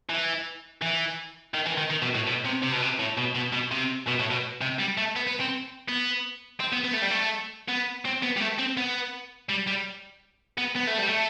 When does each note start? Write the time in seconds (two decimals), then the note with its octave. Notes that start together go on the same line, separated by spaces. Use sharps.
0.10 E3
0.82 E3
1.54 D#3
1.66 E3
1.78 D#3
1.90 D#3
2.02 B2
2.15 A2
2.27 B2
2.45 C3
2.62 C3
2.72 B2
2.82 C3
2.99 A2
3.17 B2
3.35 B2
3.53 B2
3.71 C3
4.07 B2
4.20 A2
4.31 B2
4.61 C3
4.79 G3
4.98 A3
5.16 B3
5.27 B3
5.40 C4
5.88 B3
6.60 C4
6.73 B3
6.84 B3
6.93 A3
7.02 G3
7.11 A3
7.69 B3
8.05 C4
8.23 B3
8.37 G3
8.41 A3
8.59 C4
8.77 B3
9.49 G3
9.67 G3
10.58 B3
10.76 B3
10.87 A3
10.98 G3
11.09 A3